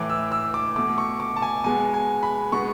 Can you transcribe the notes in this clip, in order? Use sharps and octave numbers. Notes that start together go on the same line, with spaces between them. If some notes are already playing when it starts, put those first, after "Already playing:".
Already playing: A2 E3 A3 D6
E6
E6
D6
B2 A3 D6
C#6
D6
A5
G#5
B2 G#3 B3 G#5
G#5
B5
B2 G#3 B3 C#6